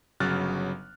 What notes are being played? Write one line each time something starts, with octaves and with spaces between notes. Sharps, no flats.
G1 C#3 F#3 F6 F#6 A6